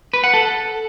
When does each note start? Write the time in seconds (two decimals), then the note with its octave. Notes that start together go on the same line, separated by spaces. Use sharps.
0.13 B4
0.24 F#5
0.34 A4